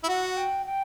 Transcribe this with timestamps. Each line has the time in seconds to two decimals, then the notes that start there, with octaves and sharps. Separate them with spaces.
0.03 E4
0.08 F#4 F#5
0.37 G5
0.66 G5